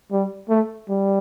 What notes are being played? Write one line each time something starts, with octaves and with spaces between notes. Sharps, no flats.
G3
A3
G3